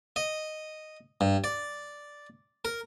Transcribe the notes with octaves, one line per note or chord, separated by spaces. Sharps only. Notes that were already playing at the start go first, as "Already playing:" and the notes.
D#5
G2
D5
A#4